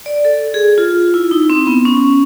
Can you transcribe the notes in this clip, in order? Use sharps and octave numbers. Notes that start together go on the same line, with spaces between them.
D5
A4
G#4
F4
E4
D#4
C4
B3
C#4